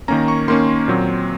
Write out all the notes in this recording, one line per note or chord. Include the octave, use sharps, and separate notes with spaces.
D#3 A#3 C#4 A#5
C#6
D#3 A#3 C#4 C6
A#2 F#3 C4